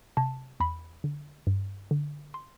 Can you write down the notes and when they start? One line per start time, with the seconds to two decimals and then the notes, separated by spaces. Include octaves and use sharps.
0.17 C3 A5
0.60 E2 B5
1.04 D3
1.47 G2
1.91 D3
2.34 C6